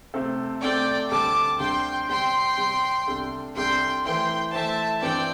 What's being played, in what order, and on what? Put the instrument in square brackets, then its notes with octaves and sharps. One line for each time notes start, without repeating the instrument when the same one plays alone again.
[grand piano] C3 A3 C4 A4 C5
[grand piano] C3 A3 C4 A4 C5 [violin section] D5 G5
[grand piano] D2 D3 G3 C4 A4 [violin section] A5 D6
[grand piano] D2 D3 G3 C4 A4 [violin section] G5 C6
[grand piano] C3 G3 C4 [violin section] G5 C6
[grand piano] C3 G3 C4
C2 C3 G3 D4 A4
[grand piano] C2 C3 G3 D4 A4 [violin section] G5 C6
[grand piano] E3 A3 E4 C5 [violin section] G5 C6
[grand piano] E3 A3 E4 C5 [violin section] E5 A5
[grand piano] G2 E3 C4 [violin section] D5 G5